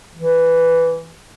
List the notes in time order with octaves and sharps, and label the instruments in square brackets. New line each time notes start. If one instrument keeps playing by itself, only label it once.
[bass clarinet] E3